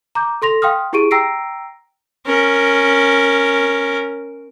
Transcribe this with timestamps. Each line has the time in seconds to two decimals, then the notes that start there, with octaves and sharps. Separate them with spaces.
0.15 A#5 D6 G6
0.42 A4 C6 A#6 F7
0.62 F5 G5 C6 D#6 F6
0.93 E4 G4 G#4 C#6 D7 D#7
1.11 G5 A#5 E6 A#6 C7 D7
2.26 C#4 A#4